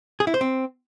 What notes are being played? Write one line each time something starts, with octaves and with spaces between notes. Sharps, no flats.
G#4
E4
C5
C4